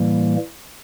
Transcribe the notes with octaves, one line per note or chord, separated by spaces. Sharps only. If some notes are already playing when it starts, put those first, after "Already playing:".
Already playing: A2 E3 G3 A#3